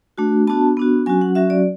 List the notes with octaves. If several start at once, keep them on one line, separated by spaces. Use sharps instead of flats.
A3 D4 F#4
B3 D4 F#4 A5
B3 D4 F#4
F#3 C#4 F#4 G#5
F#5
F#3 C#4 F#4 E5
D5